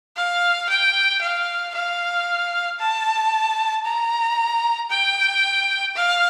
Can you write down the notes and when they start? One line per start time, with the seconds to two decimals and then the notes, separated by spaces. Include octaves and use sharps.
0.16 F5
0.69 G5
1.21 F5
1.74 F5
2.79 A5
3.85 A#5
4.90 G5
5.95 F5